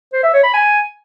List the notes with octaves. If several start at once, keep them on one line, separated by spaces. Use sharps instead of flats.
C5
E5
C#5
B5
G#5